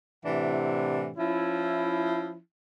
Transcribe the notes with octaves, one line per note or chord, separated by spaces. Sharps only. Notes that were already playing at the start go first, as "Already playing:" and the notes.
A2 C3 E3 D4 F#5
F3 C#4 E4